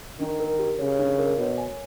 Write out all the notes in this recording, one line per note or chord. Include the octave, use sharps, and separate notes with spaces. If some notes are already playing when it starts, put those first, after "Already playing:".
D#3 D4
A#4
G4
C#3 C#5
D4
A#4
B2 C#5
G#5